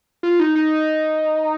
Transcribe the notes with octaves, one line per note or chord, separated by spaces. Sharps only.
F4
D#4
D#4